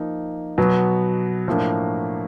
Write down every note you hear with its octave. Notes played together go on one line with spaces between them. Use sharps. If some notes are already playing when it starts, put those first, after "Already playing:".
Already playing: F3 A#3 D#4
B2 F#3 B3
A2 F3 A#3 D4